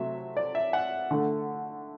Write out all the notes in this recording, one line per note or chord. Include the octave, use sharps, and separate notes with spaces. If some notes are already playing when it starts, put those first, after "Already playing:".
Already playing: C3 F#3 A3 E5
D5
E5
F#5
D3 A3